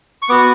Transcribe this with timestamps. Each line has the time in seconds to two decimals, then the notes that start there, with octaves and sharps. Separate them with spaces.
0.22 C#6
0.29 B3 F#4 D6